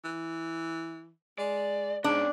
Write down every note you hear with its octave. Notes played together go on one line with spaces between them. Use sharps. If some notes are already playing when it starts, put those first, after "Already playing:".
E3
G#3 D5
G#2 B3 C#4 D4